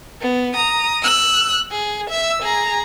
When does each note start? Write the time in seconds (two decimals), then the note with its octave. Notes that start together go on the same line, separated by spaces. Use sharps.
0.21 B3
0.54 A#5 D#6
1.03 E6 F#6
1.71 G#4
2.10 E5 E6
2.43 G#4 A#5